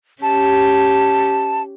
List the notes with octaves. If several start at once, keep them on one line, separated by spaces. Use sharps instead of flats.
C#4 G4 A5